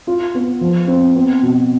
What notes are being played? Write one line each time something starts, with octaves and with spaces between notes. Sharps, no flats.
F4
B3
F3
C4
B3
B2